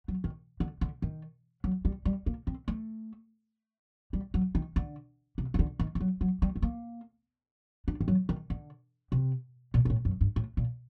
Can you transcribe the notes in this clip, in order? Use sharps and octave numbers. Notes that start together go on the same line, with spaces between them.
F#3
D#3
D3
D3
D#3
F#3
G3
G3
A#3
C4
A3
G3
F#3
D#3
D3
C3
D#3
D3
D#3
D#3
F#3
F#3
G3
A3
A#3
D4
D#3
F#3
D#3
D3
C3
A#2
A#2
A2
F#2
G2
A2
A#2